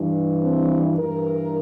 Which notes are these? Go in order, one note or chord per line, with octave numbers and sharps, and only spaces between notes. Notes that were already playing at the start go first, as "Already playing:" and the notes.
Already playing: G2 E3
C4
G2 E3 A#4